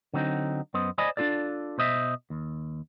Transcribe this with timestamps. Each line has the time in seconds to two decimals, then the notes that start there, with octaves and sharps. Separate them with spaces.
0.14 D3 F#3 C4 D#4
0.74 F#2 B3 C5 D#5
0.98 C5 D5 D#5 G#5 B5
1.17 D4 D#4 F4 A4 D5
1.78 B2 C5 D#5 E5
2.30 D#2